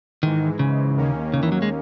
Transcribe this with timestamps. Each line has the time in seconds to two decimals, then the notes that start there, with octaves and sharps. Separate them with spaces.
0.23 G#2 D#3 E3 G#3
0.59 C#3
0.97 D#2 D#3 A#3 C#4
1.34 C#3
1.43 E3
1.52 F#3
1.62 G#3